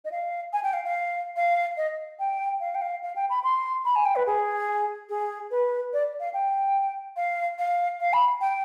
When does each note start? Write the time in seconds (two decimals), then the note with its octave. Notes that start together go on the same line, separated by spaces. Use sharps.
0.05 D#5
0.12 F5
0.53 G#5
0.63 G5
0.73 F5
0.85 F5
1.37 F5
1.77 D#5
2.19 G5
2.60 F5
2.75 G5
2.81 F5
3.03 F5
3.16 G5
3.30 B5
3.44 C6
3.85 B5
3.95 G#5
4.05 G5
4.16 B4
4.27 G#4
5.09 G#4
5.51 B4
5.93 D5
6.20 F5
6.34 G5
7.17 F5
7.59 F5
8.01 F5
8.13 B5
8.41 G5